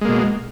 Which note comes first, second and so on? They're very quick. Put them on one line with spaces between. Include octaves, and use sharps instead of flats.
G#3 A#3 B2